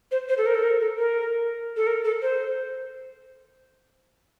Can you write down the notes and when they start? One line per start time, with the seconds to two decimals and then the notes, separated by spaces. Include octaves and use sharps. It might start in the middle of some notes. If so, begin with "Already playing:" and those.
0.11 C5
0.29 C5
0.38 A4
0.46 A#4
0.55 A4
0.64 A#4
0.81 A4
0.99 A#4
1.76 A4
1.87 A#4
2.05 A4
2.22 C5